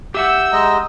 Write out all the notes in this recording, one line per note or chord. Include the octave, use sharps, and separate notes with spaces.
G4 E5 F#5 E6 G6
G#3 D#5 A#5